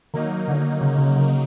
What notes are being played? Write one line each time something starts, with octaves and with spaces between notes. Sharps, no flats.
D#3 F#3 A#3 D#4
D3
C#3
C#3
C#3